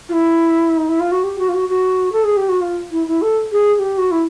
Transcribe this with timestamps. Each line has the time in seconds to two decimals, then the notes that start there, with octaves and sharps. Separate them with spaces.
0.09 F4
0.13 E4
0.77 D#4
0.88 E4
1.00 F4
1.12 F#4
1.24 G4
1.39 F#4
1.49 F4
1.54 F#4
1.69 F#4
2.12 A4
2.24 G#4
2.37 G4
2.49 F#4
2.61 F4
2.91 E4
3.07 E4
3.22 A4
3.52 G#4
3.75 G#4
3.79 G4
3.98 F#4
4.11 E4